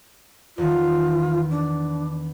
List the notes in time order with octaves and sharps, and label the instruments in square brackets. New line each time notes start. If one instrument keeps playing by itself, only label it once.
[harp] E2 D#3 [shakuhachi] F4
[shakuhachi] D4